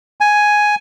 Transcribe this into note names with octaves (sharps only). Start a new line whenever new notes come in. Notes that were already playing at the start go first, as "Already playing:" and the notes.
G#5